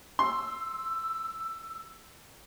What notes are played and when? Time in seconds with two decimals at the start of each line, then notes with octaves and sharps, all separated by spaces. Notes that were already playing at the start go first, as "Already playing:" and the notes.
0.19 C6 E6